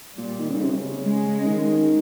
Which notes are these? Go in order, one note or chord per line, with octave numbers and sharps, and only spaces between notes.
A#2 G3
D#3
C#3
C3
C#3
G#3
C#3
D#3